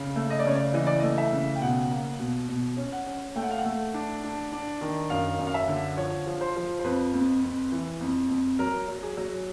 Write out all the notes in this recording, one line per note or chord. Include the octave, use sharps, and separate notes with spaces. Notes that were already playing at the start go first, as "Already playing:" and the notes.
Already playing: C#3
A3
D#5
D5
C#3 C#5
D5
E3 D#5
D5
A3 D#5
E5
C#3
G5
B2 F#5
A#3
B2
B2
C#4
F#5
C#4
A3 G5
F#5
F5
F#5
A3
D4
D4
D4
D#3
F#2 F5
F#2
F5
E5
D3
F3 C#5
F3
C5
F3
C5
F2 B4
F2
F2
E3
F2
F2
F#3 A#4
F#3
G#4
F#3